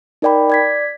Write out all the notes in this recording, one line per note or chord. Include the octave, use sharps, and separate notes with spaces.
D#4 A#4 D5 G5 B5
D5 G#6 B6